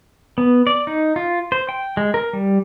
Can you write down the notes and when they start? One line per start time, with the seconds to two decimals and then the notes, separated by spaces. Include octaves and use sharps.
0.38 B3
0.67 D5
0.87 D#4
1.16 F4
1.52 C5
1.69 G5
1.97 G#3
2.14 A#4
2.33 G3